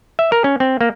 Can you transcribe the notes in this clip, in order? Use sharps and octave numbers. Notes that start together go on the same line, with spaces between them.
E5
A#4
C#4
C4
A#3